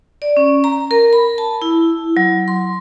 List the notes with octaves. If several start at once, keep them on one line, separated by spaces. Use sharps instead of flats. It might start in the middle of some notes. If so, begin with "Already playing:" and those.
D5
C#4
A#5
A#4
B5
A5
E4
F#3
C6